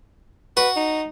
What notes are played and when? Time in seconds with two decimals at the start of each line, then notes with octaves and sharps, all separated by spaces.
0.57 F#4 B4
0.76 D#4